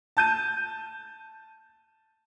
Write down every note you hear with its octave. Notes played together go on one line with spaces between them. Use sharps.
A5 G6 D#7